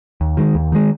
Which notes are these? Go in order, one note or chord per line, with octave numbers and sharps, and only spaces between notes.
D#2
D#3 G#3
D#2
D#3 G#3